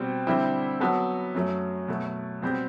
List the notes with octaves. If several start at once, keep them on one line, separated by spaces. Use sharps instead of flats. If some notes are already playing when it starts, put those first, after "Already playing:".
Already playing: B2 G3 C4
D3 G3 C4 E4
F#3 B3 F#4 A4
F#2 F#3 A3
B2 F#3 A3
B2 G3 C4 G4